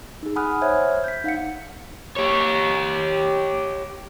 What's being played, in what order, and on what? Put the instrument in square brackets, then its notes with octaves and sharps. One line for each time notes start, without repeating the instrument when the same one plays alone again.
[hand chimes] D#4 G#4
F#5 G#5 B5 D#6 F6 F#6
C5 C#5 E5 F6 F#6 G#6
G6 B6
D#4 F5 F#5 C#7
[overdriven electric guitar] G4 C#5